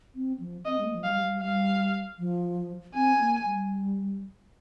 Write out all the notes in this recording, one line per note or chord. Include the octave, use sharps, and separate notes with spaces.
C4
F3
C4 D#5
G#3
A#3
F3
G3 F5
G3
G3 F5
F3
C4 G#5
A#3
G3